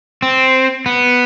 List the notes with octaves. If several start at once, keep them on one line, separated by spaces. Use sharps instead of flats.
C4
B3